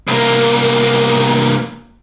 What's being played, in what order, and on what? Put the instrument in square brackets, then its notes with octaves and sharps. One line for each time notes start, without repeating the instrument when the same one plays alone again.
[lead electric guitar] C2 A#3